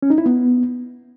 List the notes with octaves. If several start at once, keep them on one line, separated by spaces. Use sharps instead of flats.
C#4
D#4
E4
B3